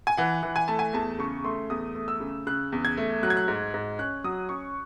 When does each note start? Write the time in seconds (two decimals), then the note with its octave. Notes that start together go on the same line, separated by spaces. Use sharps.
0.07 G#5
0.17 E3 F#5
0.43 E3
0.56 G#5
0.68 A3 A5
0.79 G#5
0.93 E2 A5
1.19 C#3 C#6
1.45 A3 C6
1.70 E2 D#6
1.95 A3
2.08 E6
2.20 C#3
2.47 C#3 F#6
2.72 E2
2.85 G#6
2.97 A3
3.23 F#3 F#6
3.30 G#6
3.37 F#6
3.48 G#2
3.74 G#2
3.99 C#4 F#6
4.24 F#3 D#6
4.49 C#4 C#6